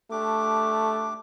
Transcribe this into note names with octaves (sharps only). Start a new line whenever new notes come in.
A3 D4 G4 D6